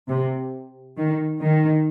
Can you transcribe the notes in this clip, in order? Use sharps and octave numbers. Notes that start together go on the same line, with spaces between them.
C3
D#3
D#3